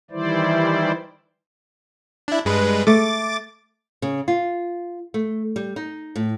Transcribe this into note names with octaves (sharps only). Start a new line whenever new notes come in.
D#3 E3 G3 E4 C5 D5
D4 E4
G2 G#3 B4
A3 D6 A6
C#3
F4
A3
G3
D#4
A2